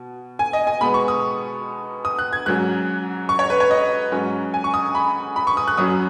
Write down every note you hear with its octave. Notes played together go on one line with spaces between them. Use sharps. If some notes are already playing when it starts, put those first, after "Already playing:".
Already playing: B2
G#5
D#5
G#5
B2 G#3 B3 B5
C#6
D#6
D#6
F#6
G#6
G#2 F#3 C#4 F#6
C#6
C#5
B4
C#5
D#5
G#2 F#3 C#4
G#5
C#6
D#6
B5
B5
C#6
D#6
F#6
F#2 F#3 C#4 D#6